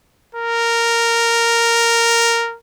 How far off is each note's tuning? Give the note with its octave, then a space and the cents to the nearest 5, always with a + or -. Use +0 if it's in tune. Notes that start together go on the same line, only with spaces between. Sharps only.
A#4 -10